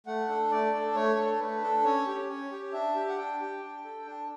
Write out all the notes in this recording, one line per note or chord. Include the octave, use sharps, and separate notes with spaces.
A3 F#5
D4 A4
A3 D5
D4 A4
A3 C#5
D4 A4
A3 B4
D4 A4
C#4 C#5
G4
C#4 C#5
G4
D4 E5
G4
F#5
D4 G5
G4
D4
A4
D4